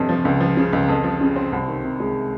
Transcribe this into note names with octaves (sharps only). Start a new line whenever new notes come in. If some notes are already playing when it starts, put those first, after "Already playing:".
Already playing: G1 F2 C3
F3
C#2
F3
C#3
C#2
F2
F3
C#3
C4
C2
D#3
C3
G#3